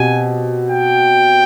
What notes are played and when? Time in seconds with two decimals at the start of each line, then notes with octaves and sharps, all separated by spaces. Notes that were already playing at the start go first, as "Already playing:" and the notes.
Already playing: B2 C4 G4 G#5
0.70 G5